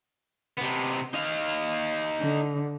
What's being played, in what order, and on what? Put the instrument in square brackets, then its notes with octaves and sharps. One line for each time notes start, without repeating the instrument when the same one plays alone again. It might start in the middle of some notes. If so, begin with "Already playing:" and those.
[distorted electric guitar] C3 B3
D#4 F5
[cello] D3